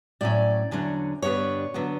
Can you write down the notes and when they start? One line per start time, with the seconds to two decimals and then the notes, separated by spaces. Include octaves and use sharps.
0.21 A2 F#3 C#4 D5
0.71 E2 D3 F#3 C#4
1.22 G2 D3 G3 B3 D4 C#5
1.74 D3 F#3 B3